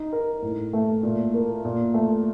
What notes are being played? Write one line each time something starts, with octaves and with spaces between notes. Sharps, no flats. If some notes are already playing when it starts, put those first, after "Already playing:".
Already playing: D#4
A#4
A2
A3
A#2
A#3
A#2
A3